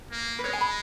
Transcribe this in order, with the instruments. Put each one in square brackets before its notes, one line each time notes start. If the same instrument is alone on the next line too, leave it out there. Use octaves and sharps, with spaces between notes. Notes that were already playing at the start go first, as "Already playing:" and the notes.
[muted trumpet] A#3
[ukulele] B4
[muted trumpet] G#3 [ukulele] C#5
[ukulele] G#5
B5